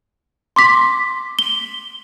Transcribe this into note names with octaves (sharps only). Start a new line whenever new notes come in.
C6 D6 B6
G7